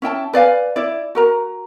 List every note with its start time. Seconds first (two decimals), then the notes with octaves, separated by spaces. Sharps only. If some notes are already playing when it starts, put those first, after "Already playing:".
0.02 C#4 E4 G5 A5
0.33 B4 D5 F5 G#5
0.76 E4 D5
1.15 F#4 A#4 A#5